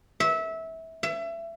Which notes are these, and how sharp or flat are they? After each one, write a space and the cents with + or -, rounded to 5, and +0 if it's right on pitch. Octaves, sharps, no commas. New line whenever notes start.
E5 -20
E5 +25